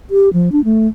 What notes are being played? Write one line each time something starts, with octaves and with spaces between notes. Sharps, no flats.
G4
F3
D4
A3